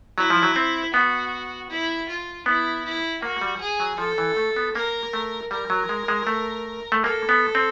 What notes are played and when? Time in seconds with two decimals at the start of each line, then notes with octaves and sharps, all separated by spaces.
0.18 F#3 E4
0.30 F3
0.43 F#3
0.56 C4
0.94 B3 F#4
1.70 E4
2.09 F4
2.46 B3 E4
2.85 E4
3.22 A#3 F#4
3.41 G3
3.60 G#4
3.80 F#3
3.98 F3 A4
4.18 E3
4.37 A3
4.56 B3
4.75 A#3 A#4
5.13 A3
5.51 G3 A#4
5.70 F#3
5.89 G#3
6.08 G#3
6.27 A3
6.92 A3
7.04 A#3 A4
7.29 B3
7.55 C4